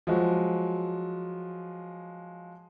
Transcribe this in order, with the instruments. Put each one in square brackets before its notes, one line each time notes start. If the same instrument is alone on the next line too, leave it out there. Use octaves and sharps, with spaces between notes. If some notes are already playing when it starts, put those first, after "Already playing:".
[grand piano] F3 F#3 G#3 F#4